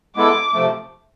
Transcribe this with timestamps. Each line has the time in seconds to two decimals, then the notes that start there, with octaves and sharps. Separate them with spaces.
0.16 G#3 B3 E4 A4 D6
0.53 C3 F3 A3